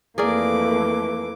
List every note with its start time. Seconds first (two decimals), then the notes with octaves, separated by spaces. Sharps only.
0.18 F2 E3 A3 A#3 G#4 A#4 D5 D6